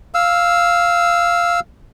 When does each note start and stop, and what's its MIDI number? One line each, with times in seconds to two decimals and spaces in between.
0.14 1.60 77
0.14 1.60 88